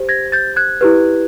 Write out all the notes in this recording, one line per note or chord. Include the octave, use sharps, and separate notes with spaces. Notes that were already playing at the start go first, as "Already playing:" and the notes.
Already playing: G4 C5
G#6 A#6
G6 A6
F#6 G#6
E4 G4 B4